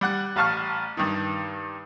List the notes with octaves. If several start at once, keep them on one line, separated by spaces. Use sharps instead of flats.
G3 F#5 F#6
A1 F5 A5 C#6 F6
G2 D#3